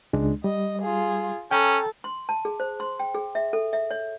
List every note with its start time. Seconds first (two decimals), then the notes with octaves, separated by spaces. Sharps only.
0.13 C#2 G#3 D4
0.44 G3 D#5
0.82 F4 G#4
1.51 C#4 A4 G5 A#5
2.04 C6
2.29 A5
2.45 G#4
2.60 C5
2.80 C6
3.00 G5
3.15 G#4
3.35 E5
3.53 A4
3.73 E5
3.91 C#5